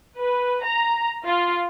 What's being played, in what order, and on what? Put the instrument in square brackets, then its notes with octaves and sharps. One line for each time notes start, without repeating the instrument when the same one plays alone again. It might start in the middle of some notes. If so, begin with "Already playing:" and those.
[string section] B4
A#5
F4